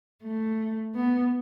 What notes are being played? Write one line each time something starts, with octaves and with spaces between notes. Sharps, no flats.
A3
B3